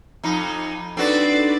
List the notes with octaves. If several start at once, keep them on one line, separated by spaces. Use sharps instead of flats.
F2 D#4 B5
C4 D4 D#4 F#4 A4 B4 D5